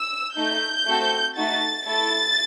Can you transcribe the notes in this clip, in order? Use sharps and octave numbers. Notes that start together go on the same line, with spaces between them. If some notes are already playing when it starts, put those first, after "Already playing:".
Already playing: E6
A3 D#4 A4 G6
A3 C4 F#4 A4
A3 D#4 F#4 A6
A3 E4 A4 A6